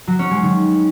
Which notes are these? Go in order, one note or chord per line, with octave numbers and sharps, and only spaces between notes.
F#3
C#4
G#3
D#3